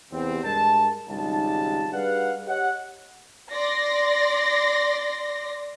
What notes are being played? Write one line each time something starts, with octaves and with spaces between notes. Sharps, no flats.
E2 C3 C4
G2 G#3 A#4 A5
G#1 C#2 G3 D#4 A5
G3 D4 G#4 B4 F5 F#5
G4 C#5 D#5 F#5
D5 C6 A#6